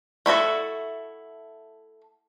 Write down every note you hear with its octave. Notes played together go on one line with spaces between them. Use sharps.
A3 E4 F#4 A4